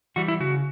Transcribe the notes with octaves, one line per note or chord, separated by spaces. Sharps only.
E3 G3 F#4
E4
C#3 F#4